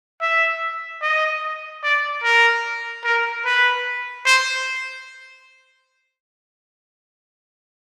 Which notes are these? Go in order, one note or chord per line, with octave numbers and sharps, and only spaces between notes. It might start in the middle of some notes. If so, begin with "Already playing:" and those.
E5
D#5
D5
A#4
A#4
B4
C5